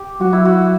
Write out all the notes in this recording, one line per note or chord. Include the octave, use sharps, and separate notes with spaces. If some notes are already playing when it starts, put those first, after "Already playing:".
Already playing: G4
F#3 F#4
E4
F#4